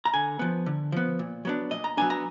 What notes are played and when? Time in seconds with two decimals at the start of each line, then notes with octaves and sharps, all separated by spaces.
0.05 A#5
0.14 D3 G#5
0.39 F3 B3
0.66 D3
0.92 F3 B3
1.19 A#2
1.45 F#3 B3 D4
1.71 A#2 D#5
1.84 A#5
1.97 F#3 B3 D4 G#5
2.10 A#5